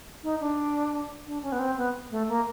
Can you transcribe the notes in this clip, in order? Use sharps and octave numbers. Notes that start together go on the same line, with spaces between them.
D#4
D4
D4
C#4
B3
C4
B3
A3
A#3